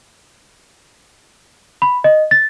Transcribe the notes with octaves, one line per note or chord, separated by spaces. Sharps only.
B5
D#5
A6